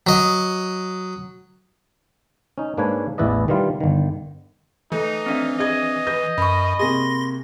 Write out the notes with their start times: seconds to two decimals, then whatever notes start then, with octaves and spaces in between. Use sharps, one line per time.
0.07 F#3 D#5
2.58 C#4 D#4
2.77 G#2 A#3 D4 B4 C#5 G#5
3.18 A1 E2 E4 B4 D5 D#5
3.48 D#3 E3 G3 F4
3.80 G1 D#3
4.92 E3 A3 D#4
5.26 C4 D4 E5
5.59 G#4 D#5 G#6
6.07 B4 G6 A#6
6.38 F#2 B5 C#6
6.79 C3 A#3 G#4 C6 A#6